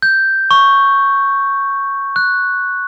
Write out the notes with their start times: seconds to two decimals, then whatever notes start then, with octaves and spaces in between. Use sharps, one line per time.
0.02 G6
0.51 C#6
2.16 F#6